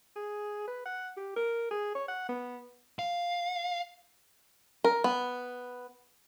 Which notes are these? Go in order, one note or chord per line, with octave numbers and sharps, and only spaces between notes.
G#4
B4
F#5
G4
A#4
G#4
C#5
F#5
B3
F5
A#4
B3